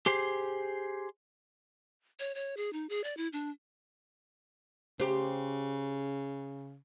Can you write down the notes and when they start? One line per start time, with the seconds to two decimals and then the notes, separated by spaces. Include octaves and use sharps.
0.06 G4 G#4 C5
2.20 C#5
2.35 C#5
2.57 G#4
2.73 D#4
2.89 G#4
3.04 D5
3.17 E4
3.33 D4
5.00 C#3 G4 C5